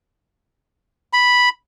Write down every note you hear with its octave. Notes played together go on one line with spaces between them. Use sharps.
B5